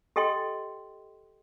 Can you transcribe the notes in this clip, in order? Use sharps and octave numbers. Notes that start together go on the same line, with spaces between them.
G4 A4 D#5 G5 C6